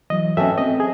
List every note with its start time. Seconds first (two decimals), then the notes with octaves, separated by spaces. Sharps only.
0.10 E3 F#3 D#5
0.37 F#3 B3 C#4 A4 E5 G5 A5
0.58 C4 D#5
0.80 G#4